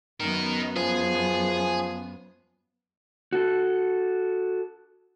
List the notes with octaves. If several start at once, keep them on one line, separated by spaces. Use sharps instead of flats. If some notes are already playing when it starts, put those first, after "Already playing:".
F#2 B3 D#4 A#4
F3 G#4
F#4 A4